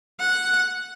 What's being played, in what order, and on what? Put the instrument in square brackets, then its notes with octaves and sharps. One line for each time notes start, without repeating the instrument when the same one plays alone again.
[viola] F#5